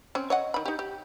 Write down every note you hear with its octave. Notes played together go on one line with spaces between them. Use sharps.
C4 C#4
C#5 D#5 F#5
D#3 B5
D#4 G4
G4